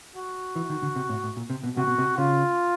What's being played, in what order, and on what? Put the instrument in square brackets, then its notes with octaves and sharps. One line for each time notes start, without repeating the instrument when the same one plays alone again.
[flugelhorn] F#4
[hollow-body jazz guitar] E3
D#3
D3
C3
A2
A2
A#2
C3
B2
[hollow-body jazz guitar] C3 [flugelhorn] F#4
[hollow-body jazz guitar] B2
C3
[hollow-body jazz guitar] C#3 [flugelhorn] F4